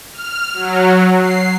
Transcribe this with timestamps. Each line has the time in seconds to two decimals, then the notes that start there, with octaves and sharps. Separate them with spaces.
0.11 F6
0.54 F#3
1.17 C7